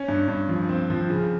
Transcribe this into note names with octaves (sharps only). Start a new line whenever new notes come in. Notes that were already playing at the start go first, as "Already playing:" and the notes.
Already playing: C#4
G2
G2
F3
C4
F3
C#3